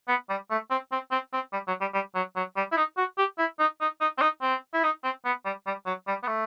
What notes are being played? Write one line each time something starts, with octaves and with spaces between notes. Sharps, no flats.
B3
G3
A3
C4
C4
C4
C4
G3
F#3
G3
G3
F#3
F#3
G3
E4
D#4
F#4
G4
E4
D#4
D#4
D#4
C4
D#4
C4
E4
D#4
C4
B3
G3
G3
F#3
G3
B3
A3